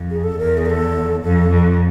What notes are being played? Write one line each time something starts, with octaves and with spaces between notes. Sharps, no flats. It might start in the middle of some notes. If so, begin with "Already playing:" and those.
Already playing: F2
G#4
A4
E2 A#4
G#4
A#4
A4
F2 A4
F2